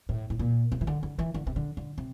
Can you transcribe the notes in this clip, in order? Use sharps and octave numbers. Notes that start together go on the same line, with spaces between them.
A2
A2
A#2
C3
E3
D3
D3
E3
D3
C3
D3
D3
C3